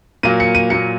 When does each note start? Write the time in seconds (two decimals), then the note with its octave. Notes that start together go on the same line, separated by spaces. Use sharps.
0.23 A#2 F#3 A#3 D#7
0.40 C#7
0.55 D#7
0.70 A#2 F#3 A#3 C#7